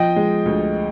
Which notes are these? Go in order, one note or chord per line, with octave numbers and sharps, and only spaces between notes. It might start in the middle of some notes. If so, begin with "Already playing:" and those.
Already playing: F3 D#5 G5
G#3
D2